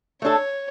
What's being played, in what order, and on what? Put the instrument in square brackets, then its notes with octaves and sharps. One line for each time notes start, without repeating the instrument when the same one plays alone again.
[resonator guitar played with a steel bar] A3 D4 A4 [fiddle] C#5